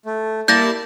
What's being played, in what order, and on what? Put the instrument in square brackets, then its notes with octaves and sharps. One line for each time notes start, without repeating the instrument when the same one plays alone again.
[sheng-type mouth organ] A3
[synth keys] G3 A#3 E4 [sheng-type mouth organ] D5 A5 [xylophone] G6 A#6